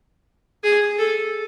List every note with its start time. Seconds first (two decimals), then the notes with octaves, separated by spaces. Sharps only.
0.64 G#4
0.98 A4